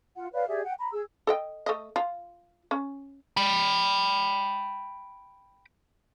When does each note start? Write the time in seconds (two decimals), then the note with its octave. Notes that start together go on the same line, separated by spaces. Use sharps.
0.16 F4 F#5
0.33 B4 C#5 D5 F5
0.48 G4 G#4 D5 E5
0.64 F#5 G5
0.79 A#5 B5
0.92 G#4 E6
1.27 A4 D#5 G5
1.66 A3 D#5
1.96 F4
2.71 C#4
3.37 G5 B5